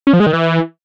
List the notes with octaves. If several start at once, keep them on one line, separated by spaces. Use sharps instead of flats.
C#4
F3
G#3
D#3
E3